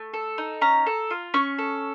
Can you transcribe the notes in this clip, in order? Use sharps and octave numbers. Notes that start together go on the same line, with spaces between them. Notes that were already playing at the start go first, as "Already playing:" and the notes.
Already playing: A3
A4
D#4
C#4 A#5
A4
F4
C#4 C#6
A4